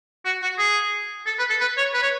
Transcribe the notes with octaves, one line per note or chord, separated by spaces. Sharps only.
F#4
F#4
G#4
A4
B4
A4
B4
C#5
B4
C#5